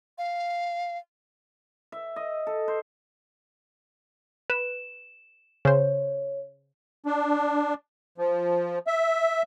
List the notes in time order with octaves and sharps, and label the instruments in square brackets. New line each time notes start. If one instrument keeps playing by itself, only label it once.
[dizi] F5
[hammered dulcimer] E5
D#5
A4
C5
[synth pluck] B4 [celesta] E7
[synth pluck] C#3 C5 [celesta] C#5
[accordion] D4
F3
E5